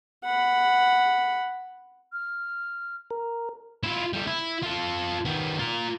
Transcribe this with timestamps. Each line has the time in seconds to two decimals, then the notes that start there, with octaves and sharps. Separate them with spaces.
0.24 F#5 B5
2.13 F6
3.11 A#4
3.84 E4 F4
4.13 G3 A4
4.27 E4
4.62 F4 A4
5.25 D#3 B3
5.59 F4 A#4